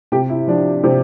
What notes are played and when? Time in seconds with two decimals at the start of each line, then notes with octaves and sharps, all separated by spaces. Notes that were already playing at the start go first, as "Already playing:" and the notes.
0.12 C3 G4
0.29 E4
0.47 F3 D4
0.83 C3 C4